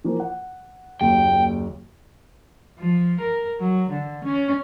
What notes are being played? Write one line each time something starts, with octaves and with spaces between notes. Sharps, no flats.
E3 F3 A#3
F#5
F#1 D#2 G5
F3
A#4
F#3
D3
C#4